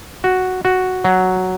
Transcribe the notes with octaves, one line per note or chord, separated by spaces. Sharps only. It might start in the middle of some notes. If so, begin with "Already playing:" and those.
F#4
F#4
F#3